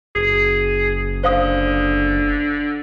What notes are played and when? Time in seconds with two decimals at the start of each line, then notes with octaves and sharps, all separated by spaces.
0.15 F#1 G#4
1.24 D3 C5 F5 D#6